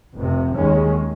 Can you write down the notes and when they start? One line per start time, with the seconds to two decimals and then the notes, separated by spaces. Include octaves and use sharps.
0.14 F1 F2 C3
0.55 D#2 D#3 G#3 C#4